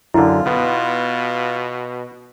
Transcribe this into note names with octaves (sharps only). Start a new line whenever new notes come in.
F#2 D3 E4 F4
B2 B3